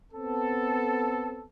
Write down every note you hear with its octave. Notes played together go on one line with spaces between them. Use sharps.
B3 C4 A4